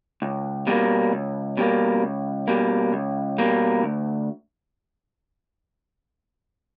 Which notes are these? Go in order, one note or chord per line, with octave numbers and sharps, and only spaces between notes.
C#2
B2 G3 A#3
C#2
B2 G3 A#3
C#2
B2 G3 A#3
C#2
B2 G3 A#3
D2